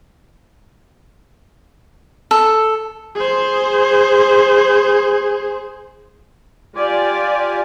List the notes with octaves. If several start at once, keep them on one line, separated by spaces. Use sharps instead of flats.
A4
G#4 C5
F4 G4 D5 G#5